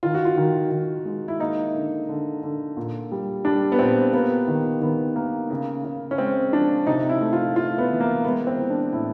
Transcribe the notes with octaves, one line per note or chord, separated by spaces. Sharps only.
D#3 F4
F#4
F4
D#3
D#3
G#3
E4
A#3 D#4
D3
D3
D3
A#2
G3
G3 D4
B3
A#2 C4
A#3 B3
D#3
D#3 B3
A#3
C#3
C#3
C#4
G#3 C4
F3 D4
C3 D#4
E4
A3
F4
A3 F4
B3
E3
A#3
G#3 B3
C4
E3
D4
A2 E4